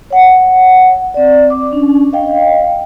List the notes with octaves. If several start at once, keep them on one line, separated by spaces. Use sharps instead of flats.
C#5 F#5
C4 D5
D6
C#4 D4
D#5 F5 G5